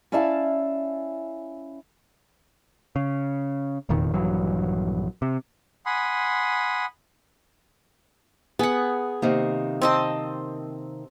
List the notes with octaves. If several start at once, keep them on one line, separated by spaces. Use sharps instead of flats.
C#4 E4 D5 E5 F5 A5
C#3
F1 E2 A#2 D#3
A#1 G2 E3 F#3
C3
F#5 G#5 B5 C6 D#6
B3 G#4 F#5
C3 D#3 A#3
C4 D#5 A5